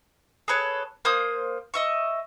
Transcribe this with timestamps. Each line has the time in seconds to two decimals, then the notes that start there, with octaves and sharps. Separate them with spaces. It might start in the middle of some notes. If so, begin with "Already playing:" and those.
0.48 G#4 A4 B4 C#5
1.05 A#3 C5 D#6
1.74 D#5 E5 C#6